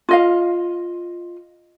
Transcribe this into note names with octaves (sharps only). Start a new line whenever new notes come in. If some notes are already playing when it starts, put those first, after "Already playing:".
F4 D#5 F5